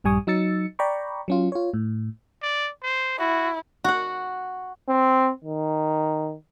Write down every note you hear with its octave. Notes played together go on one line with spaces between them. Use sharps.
A#1 G2 G3 G#5 C#6 D#6
F#3 D#4 E6 A6 C#7
D5 G5 A#5 B5 C#6
F#3 C#4 F4
F4 C#5
A2
D5
C5
E4 F#4
F#4 F#5
C4
D#3